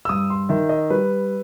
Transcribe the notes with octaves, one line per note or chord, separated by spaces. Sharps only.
E6
G2 D#6
C6
D#3 E5
D#5
G3 B4